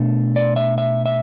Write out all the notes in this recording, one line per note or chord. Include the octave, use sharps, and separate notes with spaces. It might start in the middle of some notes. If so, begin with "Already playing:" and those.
Already playing: B2 A3 D4
D5
E5
E5
E5